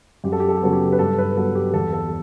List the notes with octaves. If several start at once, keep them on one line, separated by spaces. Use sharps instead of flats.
F#2 G4
A4
G4
A4
G4
C#3 F#3 B3 A4
G4
B4
G2 A4
B4
F#3 B3 A4
G4
E2 A4
A4